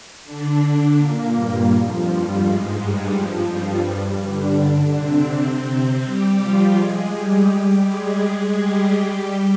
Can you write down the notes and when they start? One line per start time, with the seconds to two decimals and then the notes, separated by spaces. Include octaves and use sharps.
0.24 D3 D4
0.97 A#2 A#3
1.33 G2 G3
1.69 F2 F3
2.05 G2 G3
2.41 G#2 G#3
2.78 G2 G3
3.14 F2 F3
3.51 G2 G3
4.23 D3 D4
4.95 C3 C4
5.67 C3 C4
6.03 G3 G4
6.40 F3 F4
6.76 G#3 G#4
7.12 G3 G4
7.84 G#3 G#4
8.57 G3 G4
8.93 G3 G4